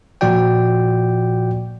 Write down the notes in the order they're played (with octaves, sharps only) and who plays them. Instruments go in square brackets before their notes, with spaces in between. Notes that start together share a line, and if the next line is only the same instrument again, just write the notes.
[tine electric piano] A#2 F3 F#4 D5 G5